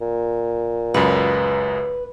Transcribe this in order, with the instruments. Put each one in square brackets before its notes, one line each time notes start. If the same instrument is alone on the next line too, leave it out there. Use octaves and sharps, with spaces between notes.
[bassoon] A#2
[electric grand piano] C#2 F#2 [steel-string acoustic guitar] B4